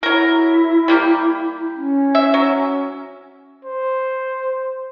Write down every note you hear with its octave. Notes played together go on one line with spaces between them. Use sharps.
F#3 E4 A#4
G3 A#3 G4
C#4
E5
F#3
C5